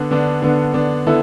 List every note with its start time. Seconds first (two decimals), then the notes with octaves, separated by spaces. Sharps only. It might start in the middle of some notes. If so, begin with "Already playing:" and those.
Already playing: D3 B3 D4
0.11 D3 B3 D4
0.42 D3 B3 D4
0.73 D3 B3 D4
1.06 D3 B3 E4 A4